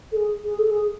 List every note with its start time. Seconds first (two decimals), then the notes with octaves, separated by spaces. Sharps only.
0.12 A4
0.16 G#4
0.44 G#4
0.58 A4
0.71 G#4